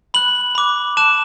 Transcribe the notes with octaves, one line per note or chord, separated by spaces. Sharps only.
B5 F#6 F#7
B5 D6 F#6
A5 D6 F#6 E7